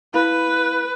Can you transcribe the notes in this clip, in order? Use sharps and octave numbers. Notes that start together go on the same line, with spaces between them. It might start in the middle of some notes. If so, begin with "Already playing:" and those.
E4 B4 F5 B5